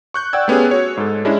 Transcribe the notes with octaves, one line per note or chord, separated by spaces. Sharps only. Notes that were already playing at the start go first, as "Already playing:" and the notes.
C#6 F#6 G6
D5 F#5 G5 E6 G#6
A3 B3 C#4 G4 G#4
F#4 C#5
G#2 A4
G#3 C#4 D4 E4